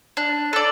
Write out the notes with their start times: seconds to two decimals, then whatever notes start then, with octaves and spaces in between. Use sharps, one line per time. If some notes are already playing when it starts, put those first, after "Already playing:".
0.17 D4
0.53 A4 D5